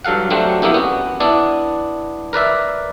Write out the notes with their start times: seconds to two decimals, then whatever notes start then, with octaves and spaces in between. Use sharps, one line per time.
0.05 G2 F#3 A4 F5 F#5
0.30 F#3 A3 C4 D4 G4
0.62 F#3 A#3 B3 E4 G4
0.74 B3 C#4 F#4
1.20 B3 D4 E4 D5
2.33 A#4 B4 D5 E5